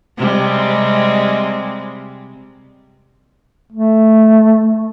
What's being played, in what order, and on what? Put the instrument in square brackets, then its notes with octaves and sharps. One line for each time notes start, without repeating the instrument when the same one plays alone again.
[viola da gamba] C3 G3 G#3
[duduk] A3